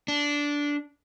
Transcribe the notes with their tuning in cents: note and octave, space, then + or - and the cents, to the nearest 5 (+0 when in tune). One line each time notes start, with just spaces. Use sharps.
D4 -10